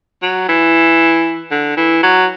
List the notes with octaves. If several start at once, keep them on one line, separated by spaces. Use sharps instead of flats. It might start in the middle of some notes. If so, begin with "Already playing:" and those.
F#3
E3
D3
E3
F#3